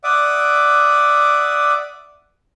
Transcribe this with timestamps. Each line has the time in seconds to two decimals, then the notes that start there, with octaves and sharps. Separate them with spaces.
0.04 D5 E5 F#5 D6 D#6